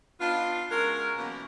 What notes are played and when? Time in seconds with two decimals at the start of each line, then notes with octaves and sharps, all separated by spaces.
0.21 B3 D4 D#4 F4
0.71 G#3 C#4 F#4 A#4
1.17 B2 E3 F#3 A#3 B3 C#4